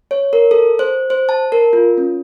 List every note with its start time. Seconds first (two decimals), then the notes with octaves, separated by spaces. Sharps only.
0.11 C#5
0.33 A#4
0.51 A4
0.79 C5
1.10 C5
1.29 A5
1.52 A#4
1.73 F4
1.98 C#4